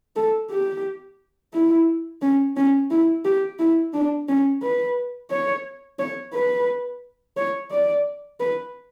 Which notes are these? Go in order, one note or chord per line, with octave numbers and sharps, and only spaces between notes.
A4
G4
E4
C#4
C#4
E4
G4
E4
D4
C#4
B4
C#5
C#5
B4
C#5
D5
B4